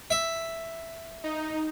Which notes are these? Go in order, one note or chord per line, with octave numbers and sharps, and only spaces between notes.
E5
D#4